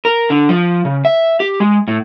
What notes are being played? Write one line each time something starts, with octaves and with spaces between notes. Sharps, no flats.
A#4
D3
F3
C#3
E5
G4
G#3
A2